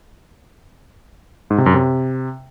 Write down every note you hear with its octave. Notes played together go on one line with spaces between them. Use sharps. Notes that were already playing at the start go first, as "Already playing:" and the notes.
G#2
C3
F#2
C3